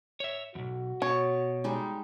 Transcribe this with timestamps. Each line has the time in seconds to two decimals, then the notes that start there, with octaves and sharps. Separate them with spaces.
0.20 C#5 E5
0.55 B1 F2 F#4
1.02 B2 C#5
1.64 G3 G#3 D#4